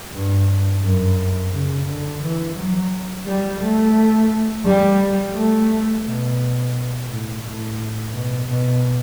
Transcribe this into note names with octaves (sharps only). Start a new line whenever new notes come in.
G2
F#2
C#3
D3
E3
F#3
G3
A3
G3
A3
B2
A2
A2
B2
B2